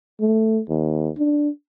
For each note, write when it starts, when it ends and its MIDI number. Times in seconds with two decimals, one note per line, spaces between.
0.20 0.61 57
0.69 1.09 39
1.18 1.49 62